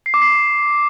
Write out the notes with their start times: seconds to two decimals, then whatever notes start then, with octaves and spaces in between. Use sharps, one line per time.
0.06 C7
0.14 D6
0.22 C7